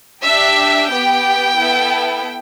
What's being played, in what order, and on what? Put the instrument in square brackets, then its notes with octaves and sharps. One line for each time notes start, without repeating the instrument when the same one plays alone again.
[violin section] D4 G4 E5
B3 G4 G5
B3 E4 A4